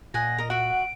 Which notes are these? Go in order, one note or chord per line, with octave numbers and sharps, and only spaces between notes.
A#2 D#5 F#5 G#5 A#6
A#4 D#5
F#4 E5 F#5 D7